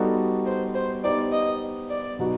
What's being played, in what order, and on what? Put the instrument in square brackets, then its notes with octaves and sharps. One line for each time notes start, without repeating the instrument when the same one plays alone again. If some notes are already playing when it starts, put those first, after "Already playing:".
Already playing: [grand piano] G3 B3 D#4 F#4 A4
[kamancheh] C5
C5
[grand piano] B3 D#4 G4 C5 [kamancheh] D5
[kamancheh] D#5
D5
[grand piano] B2 F#3 B3 D#4 F#4